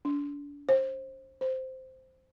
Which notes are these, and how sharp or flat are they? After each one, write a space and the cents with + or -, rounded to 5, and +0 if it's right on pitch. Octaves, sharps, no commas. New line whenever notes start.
D4 -35
C5 +25
C5 -5